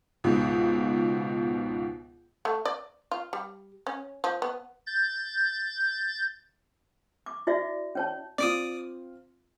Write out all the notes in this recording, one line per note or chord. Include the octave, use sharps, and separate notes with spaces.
C#2 G#2 B2
A3
D5
F4
G3
C#4
F3
B3
G6 A6
D6
E4 F#4 D5 E5
C#4 C#5 A5
C4 F4 D5 D6 D#6